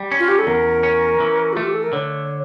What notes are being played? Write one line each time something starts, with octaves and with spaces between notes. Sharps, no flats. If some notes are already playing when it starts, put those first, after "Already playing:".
Already playing: G3
C#4
F4
G4
A4
E2 A#4
C#4
E3
A3 F4
G4
A4
A#4
D3 C#5